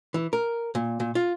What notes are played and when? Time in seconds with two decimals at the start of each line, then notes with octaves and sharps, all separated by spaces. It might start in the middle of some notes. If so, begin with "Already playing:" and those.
0.14 E3
0.33 A#4
0.75 A#2
1.00 A#2
1.15 F4